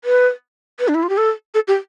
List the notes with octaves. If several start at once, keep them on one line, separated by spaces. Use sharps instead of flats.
B4
B4
D4
E4
F4
G4
A4
A4
G4